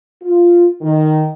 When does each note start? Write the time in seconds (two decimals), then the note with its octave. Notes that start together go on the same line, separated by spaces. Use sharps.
0.22 F4
0.81 D#3